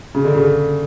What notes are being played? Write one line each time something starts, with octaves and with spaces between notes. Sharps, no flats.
C#3
D3
C#3